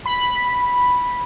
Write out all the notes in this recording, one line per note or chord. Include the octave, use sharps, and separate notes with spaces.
B5